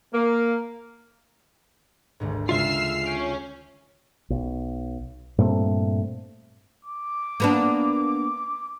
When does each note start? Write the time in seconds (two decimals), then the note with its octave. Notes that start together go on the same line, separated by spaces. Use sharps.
0.13 A#3
2.20 G#1 D2 G#2
2.49 D2 C#3 G#3 F4 E5 E6 F6 C7
3.06 C#4 G6 D7
4.30 B1
5.38 G2 A#2 A3 C4
6.85 D6
7.40 A#3 B3 D4